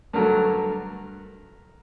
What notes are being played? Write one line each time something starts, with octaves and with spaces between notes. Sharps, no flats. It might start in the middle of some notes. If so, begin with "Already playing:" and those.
G2 D3 F#3 A3 A#4